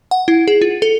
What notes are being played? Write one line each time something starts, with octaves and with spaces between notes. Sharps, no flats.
F#5
E4
G#4
F4
A4